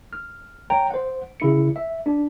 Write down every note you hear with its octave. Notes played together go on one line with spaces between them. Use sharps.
F6
C#5 G5 A#5
C5 F#5
C#3 E4 C#7
E5
D4